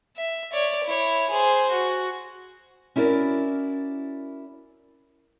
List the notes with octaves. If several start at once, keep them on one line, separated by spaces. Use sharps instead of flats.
E5
C#5 D5
E4 C#5
G#4 C5
F#4
C#4 E4 F#4 A#4 D5